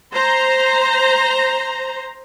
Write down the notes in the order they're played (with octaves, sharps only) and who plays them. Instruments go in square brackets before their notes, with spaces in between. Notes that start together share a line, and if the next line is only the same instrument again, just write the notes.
[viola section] C5 A#5